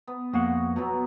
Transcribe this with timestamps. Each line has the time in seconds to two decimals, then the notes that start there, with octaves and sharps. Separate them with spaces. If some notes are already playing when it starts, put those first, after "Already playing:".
0.07 B3
0.33 F2 A#3 F#4 F#5
0.76 B2 F#3 B3